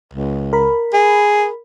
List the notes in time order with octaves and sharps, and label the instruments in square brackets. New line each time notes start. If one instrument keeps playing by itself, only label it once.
[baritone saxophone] C#2
[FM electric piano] A#4 B5
[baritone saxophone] G#4